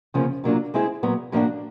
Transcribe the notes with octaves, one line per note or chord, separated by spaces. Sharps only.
E2 C#3 F3 A#3 C#4
A#2 F#3 A#3 D4 F4
G#3 C4 E4 G#4 C5
A#2 F#3 B3
A2 F3 A#3 D4 F#4